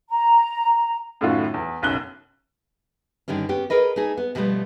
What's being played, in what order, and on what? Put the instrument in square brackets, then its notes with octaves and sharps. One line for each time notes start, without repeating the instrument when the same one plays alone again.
[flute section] A#5
[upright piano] F#2 A2 D#3 A3 F4 F#4
E2
F#1 B1 F#2 F#6 G7
[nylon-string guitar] G2 D3 D#3 G3 C#4
B3 C#4 G4
G#4 A#4 B4 D#5
A3 D#4 G#4
B3
B2 D3 F3 G3 A3 B3